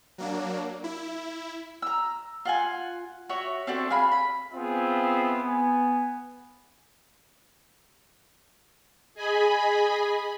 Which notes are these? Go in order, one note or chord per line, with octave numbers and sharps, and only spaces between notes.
F#3 A#3 D4
E4
A#5 E6
F4 F#5 G#5
F#4 C#5 E5
C4 D4 F#4 A4
G#4 F5 G#5 B5
B5
B3 C4 F4 G#4 E5
B3 G#5
G#4 D#5 G#5 B5